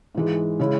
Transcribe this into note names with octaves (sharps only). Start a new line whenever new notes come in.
G#2 E3 G#3
C#3 G#3 C#4 E4